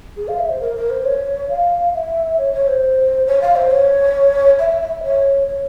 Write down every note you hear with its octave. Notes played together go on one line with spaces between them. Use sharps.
G#4
F5
E5
C5
A#4
A#4
C5
C#5
F5
E5
C#5
C#5
C5
C#5
F5
C5
C#5
E5
E5
C#5
C#5